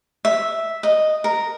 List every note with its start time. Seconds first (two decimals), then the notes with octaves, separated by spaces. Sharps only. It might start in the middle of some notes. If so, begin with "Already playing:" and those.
0.25 E5
0.83 D#5
1.24 A#4